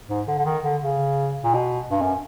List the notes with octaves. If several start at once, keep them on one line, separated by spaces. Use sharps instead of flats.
G#2
D3
D3
D#3
D3
C#3
A#2
B2
G2
F#2